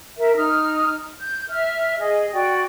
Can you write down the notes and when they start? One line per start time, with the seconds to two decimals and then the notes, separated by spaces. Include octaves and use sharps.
0.18 A#4 E5
0.35 D#4 F6
1.20 G6
1.49 E5 F6
1.99 G#4 D#5
2.34 F#4 D5 G5